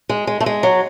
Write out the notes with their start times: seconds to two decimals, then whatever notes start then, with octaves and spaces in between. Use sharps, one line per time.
0.09 G#3
0.27 G#3
0.41 A3
0.46 G#3
0.63 F#3